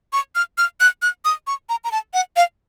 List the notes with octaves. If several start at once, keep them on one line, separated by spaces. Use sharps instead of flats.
C#6
F6
F6
F#6
F#6
D#6
C#6
A#5
A#5
A5
F#5
F5